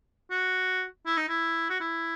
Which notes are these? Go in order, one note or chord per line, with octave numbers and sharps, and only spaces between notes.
F#4
E4
D#4
E4
F#4
E4